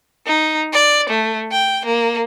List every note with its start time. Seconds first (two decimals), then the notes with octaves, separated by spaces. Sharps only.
0.27 D#4
0.73 D5
1.10 A3
1.52 G5
1.86 A#3